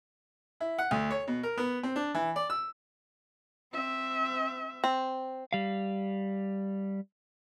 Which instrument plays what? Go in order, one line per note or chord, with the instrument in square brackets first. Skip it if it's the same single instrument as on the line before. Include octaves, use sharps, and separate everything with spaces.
[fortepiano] E4
F#5
D2
C#5
B2
A#4
B3
C4
D4
E3
D5
E6
[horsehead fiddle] C4 E5
[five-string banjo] C4
[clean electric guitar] G3 F5